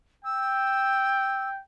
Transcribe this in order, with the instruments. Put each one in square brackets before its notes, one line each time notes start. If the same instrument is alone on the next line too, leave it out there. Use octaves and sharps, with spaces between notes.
[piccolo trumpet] G5 [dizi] E6